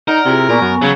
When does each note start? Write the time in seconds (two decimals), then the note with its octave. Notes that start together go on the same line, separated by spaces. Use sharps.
0.08 D#4 A#4 D5 F#5
0.26 C3 E4 F4 G#4
0.49 A#2 B3 G#5 C#6
0.61 F#2
0.82 C#3 F#3